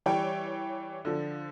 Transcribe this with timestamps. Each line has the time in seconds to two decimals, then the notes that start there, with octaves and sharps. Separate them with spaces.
0.06 E3 G3 C#5 G5
1.05 D3 F3